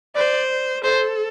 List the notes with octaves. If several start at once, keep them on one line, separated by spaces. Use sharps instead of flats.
C5 D5
A4 C5